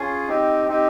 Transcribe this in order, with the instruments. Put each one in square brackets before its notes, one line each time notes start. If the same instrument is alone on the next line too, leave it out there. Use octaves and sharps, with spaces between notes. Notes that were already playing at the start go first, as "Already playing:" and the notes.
Already playing: [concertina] C#4 F4 G#4
C4 D#4 G4
C4 D#4 G4